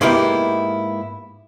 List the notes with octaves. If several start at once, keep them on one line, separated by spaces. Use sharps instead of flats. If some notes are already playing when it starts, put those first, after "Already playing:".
G#2 A#3 B3 E4 G4